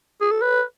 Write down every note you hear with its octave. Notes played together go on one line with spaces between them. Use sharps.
G#4
A4
B4